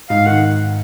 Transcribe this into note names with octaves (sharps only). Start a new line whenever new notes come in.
G#2 F5
D#3 F#5